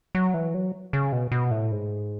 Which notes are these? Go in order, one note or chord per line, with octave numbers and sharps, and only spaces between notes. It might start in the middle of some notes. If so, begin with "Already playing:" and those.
F#3
E3
F#3
C#3
B2
B2
A2
G#2